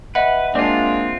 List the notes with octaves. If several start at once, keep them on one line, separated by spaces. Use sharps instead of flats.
B4 D#5 E5 F#5
G#3 A#3 C4 D4 F4